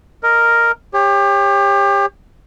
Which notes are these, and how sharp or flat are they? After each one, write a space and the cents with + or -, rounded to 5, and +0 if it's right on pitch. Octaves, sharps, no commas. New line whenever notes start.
A#4 +0 D#5 +0
G4 +30 C#5 -15